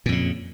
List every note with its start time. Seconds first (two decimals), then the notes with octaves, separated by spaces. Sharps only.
0.06 A#2
0.09 F2
0.12 C#3